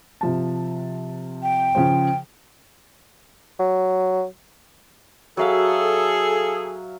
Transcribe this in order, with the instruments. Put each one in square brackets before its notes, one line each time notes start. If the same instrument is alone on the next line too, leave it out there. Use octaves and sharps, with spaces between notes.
[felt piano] C3 F3 A5
[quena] G5
[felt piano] C#3 F3 C5
[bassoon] F#3
[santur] F#3 E5 F5 [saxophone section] G#4 A4